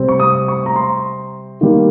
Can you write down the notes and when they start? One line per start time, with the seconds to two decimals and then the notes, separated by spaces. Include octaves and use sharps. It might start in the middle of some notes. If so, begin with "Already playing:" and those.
Already playing: C3 G3 C4
0.08 C#6
0.20 D#6
0.48 C#6
0.66 A#5
0.76 C6
1.61 D#3 G3 A#3